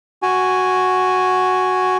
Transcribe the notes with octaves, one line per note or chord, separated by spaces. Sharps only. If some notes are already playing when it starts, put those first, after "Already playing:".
F#4 G#5